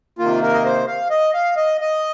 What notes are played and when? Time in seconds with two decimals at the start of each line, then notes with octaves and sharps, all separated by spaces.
0.19 C3 D#3 A#3 F4
0.42 A#4
0.53 D#5
0.65 C5
0.87 F5
1.10 D#5
1.34 F5
1.57 D#5
1.81 D#5